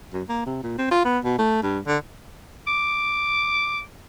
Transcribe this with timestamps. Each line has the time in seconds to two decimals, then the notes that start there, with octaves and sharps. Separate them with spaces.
0.13 F#2
0.29 A#3
0.46 C3
0.63 A#2
0.78 C4
0.91 F4
1.05 B3
1.24 B2
1.39 A3
1.63 G2
1.87 D3
2.67 D6